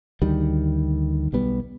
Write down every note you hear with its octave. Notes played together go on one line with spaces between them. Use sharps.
D2 D#3 G3
B1 G3 B3